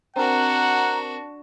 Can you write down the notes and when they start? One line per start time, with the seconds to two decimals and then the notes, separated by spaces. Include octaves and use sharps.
0.16 C4 D4 F#4 A#4 F#5 A#5